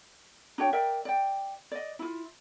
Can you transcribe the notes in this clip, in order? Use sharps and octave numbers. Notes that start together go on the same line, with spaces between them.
D4 F#4 C#5 G5
A#4 D5 E5 G5
D5 G5
D5 D#5
E4 F4